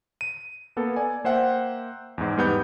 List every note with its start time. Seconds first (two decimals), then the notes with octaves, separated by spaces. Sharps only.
0.21 D#7
0.76 A#3 B3 A4
0.96 D5 G#5
1.24 A#3 C5 E5 F#5 G5
2.18 E2 G#2
2.37 G#2 G3 B3 B5 G6